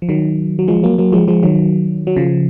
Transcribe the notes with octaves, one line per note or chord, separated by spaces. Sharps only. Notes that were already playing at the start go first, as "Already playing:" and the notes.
F3
D#3 F#3
F#3
F3 G#3
F#3 A#3
F#3 A#3
F3 G#3
F3 G#3
D#3 F#3
F#3
C#3 F3